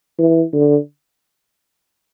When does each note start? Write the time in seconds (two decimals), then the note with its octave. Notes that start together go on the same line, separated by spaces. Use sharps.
0.19 E3
0.53 D3